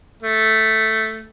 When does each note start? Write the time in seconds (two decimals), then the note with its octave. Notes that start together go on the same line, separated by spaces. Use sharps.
0.22 A3